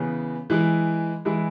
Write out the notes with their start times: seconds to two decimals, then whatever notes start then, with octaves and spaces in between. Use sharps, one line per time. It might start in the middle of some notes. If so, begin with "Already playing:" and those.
Already playing: C#3 E3 B3 G#4
0.50 E3 G#3 E4 G#4
1.25 E3 G#3 E4 G#4